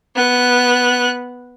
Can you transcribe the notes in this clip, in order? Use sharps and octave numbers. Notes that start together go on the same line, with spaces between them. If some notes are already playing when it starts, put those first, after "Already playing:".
B3 F#6